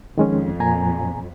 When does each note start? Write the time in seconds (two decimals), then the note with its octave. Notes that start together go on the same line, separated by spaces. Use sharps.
0.18 F2 D#3 G#3 C#4
0.60 A#2 G#5 A#5